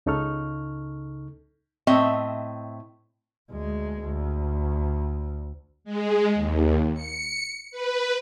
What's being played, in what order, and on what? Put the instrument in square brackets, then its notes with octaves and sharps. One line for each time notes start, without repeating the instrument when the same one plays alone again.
[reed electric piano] C#2 C#3 D#4 A4 C#6 F6
[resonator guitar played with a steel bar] A2 C4 D#5 E5
[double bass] D2 G#3
D2
[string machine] G#3
D#2
C#7
B4